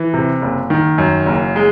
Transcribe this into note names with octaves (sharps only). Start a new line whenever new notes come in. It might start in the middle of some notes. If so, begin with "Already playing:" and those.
Already playing: E3
C3
F#1
D#3
F#2
F#1
G#3